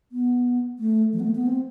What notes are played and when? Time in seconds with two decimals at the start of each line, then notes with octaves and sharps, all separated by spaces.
0.12 B3
0.79 A3
1.13 F3
1.20 B3
1.24 A3
1.35 B3
1.46 C4